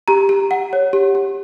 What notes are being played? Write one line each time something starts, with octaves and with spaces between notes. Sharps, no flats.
G4 A#5
G4
F#5
C#5
G4
G4